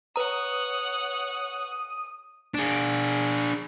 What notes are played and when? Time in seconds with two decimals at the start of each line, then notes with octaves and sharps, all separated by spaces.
0.16 B4 C#5 F#5 A#5 D#6
2.54 D4 G#4